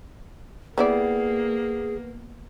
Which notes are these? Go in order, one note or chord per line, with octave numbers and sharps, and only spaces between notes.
G3 A#3 B3 E4 G#4 D5